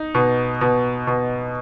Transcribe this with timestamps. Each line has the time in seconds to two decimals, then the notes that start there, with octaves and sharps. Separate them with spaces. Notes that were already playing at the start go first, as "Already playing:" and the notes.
Already playing: D#4
0.15 B2
0.61 B2
1.07 B2